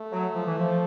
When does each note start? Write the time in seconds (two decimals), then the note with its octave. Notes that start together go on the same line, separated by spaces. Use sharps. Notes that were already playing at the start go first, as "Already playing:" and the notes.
Already playing: A3
0.12 F#3
0.34 F3
0.46 E3
0.58 F3